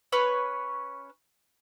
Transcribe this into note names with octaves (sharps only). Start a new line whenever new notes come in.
C#4 B4 C#5